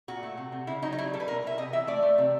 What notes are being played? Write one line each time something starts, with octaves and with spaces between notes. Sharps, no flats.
A#2 F#4
A3
C3
C3
C#3 E4
F#3 D#4
D#4
G3 E4
G3 A4
B4
B2 A#4
B2 E5
C3 D#5
E3 E5
A3 D5
A3
C3